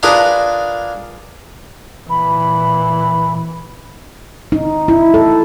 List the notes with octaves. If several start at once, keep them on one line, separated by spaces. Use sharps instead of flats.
D4 F4 G#4 A#4 B4
A#2 E3 B5
D#4
E4
A4